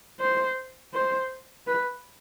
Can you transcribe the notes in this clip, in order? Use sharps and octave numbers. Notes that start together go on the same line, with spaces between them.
C5
C5
B4